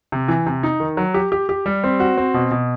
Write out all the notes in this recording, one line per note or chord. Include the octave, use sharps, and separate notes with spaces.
C3
E3
C3
D#4
D#3
F#3
G4
G4
G4
G3
C4
F#4
C4
B2
B2